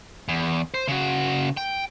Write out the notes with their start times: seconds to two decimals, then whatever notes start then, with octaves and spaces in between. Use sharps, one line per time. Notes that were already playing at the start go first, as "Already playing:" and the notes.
0.28 E2
0.74 C5
0.88 C#3 F#4
1.57 G5